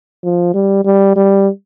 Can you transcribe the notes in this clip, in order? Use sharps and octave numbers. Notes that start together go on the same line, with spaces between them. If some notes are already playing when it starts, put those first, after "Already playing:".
F3
G3
G3
G3